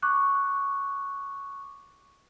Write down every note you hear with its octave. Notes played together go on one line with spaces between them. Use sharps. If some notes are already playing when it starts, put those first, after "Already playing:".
C#6 D6 F#6